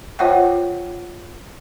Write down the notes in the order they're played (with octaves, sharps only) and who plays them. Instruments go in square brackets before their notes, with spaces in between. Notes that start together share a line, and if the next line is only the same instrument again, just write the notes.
[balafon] F4 C5 C#5 E5 F#5 G5